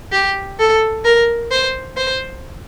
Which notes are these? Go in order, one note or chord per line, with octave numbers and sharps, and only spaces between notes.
G4
A4
A#4
C5
C5